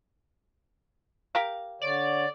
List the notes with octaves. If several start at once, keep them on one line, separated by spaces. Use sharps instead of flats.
G4 A#4 F5
D3 C#5 D5